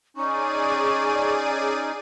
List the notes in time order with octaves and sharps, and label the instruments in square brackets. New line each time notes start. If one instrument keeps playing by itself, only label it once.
[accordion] C#4 D#4 [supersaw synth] G#4 D5 D#7 [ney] C#6